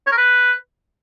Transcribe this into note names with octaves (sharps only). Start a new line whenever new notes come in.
C#5
A#4
B4